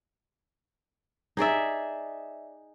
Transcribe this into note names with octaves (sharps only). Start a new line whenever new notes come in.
D#4 G#4 D5 E5